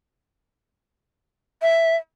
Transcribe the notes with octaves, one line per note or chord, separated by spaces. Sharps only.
E5